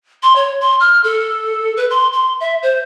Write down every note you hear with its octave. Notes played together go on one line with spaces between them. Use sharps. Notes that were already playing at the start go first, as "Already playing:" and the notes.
C6
C#5
C6
F6
A4
B4
C6
C6
E5
C5